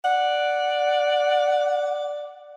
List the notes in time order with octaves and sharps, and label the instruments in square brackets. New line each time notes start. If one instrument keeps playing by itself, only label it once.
[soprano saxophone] D5 [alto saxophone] F#5